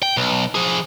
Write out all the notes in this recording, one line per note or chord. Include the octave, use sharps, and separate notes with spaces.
G5
B1
F3 G#4